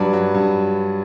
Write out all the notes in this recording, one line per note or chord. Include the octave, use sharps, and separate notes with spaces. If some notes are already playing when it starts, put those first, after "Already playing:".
Already playing: G2 F#3 B4 D5
F#3
G2